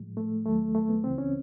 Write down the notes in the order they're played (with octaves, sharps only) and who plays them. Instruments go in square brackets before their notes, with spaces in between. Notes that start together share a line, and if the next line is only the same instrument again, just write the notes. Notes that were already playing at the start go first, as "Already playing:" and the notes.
Already playing: [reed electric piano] A2 F3 G#3
A3
D#2 D#3 F#3 A3
A3
B3
C#2 C#3 E3 C4
C#4